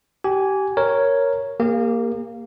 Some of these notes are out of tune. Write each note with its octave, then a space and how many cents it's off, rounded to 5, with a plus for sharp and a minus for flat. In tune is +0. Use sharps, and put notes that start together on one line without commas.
G4 -25 G#5 +0
A#4 +0 C#5 +0
A#3 +0 G4 +45